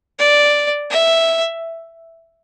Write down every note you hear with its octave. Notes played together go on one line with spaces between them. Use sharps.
D5
E5